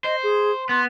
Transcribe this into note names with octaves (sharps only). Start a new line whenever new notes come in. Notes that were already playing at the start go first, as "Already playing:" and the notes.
C5 D#5
G#4
B3 C6